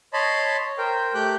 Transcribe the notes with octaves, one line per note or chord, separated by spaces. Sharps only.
C#5 D#5 A5 B5 C6
A#4 C5 G5
A3 G4 G5 D6 F#6 G6